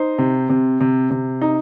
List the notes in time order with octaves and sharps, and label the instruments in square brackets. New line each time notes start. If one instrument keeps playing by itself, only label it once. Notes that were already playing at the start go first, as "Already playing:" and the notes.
Already playing: [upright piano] D#4 C5
C3
C3
C3
C3
D#4